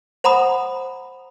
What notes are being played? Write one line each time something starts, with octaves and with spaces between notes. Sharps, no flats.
C5 F#5 A#5 B5 D#6